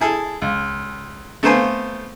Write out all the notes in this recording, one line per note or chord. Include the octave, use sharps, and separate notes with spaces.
E4 G#4 A4
C#2
A3 B3 C4 C5 F5 G#5